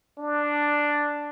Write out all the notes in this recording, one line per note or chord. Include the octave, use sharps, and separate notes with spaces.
D4